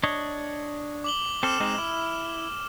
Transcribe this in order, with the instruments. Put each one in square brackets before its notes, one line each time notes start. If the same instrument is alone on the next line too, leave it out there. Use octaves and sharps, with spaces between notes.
[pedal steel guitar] D4 C#5 D#5
[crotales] D6 F#7 G7
[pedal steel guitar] C4 A4 [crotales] D6 F6 E7
[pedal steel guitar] G#3 C4 D#4
E4